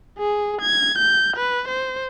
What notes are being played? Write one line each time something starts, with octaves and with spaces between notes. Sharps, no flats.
G#4
G#6
G6
B4
C5